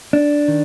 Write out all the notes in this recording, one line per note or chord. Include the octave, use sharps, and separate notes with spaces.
D4
D#3